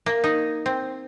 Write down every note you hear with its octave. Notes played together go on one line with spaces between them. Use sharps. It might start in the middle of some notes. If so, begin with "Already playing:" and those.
A#3
D#4
C4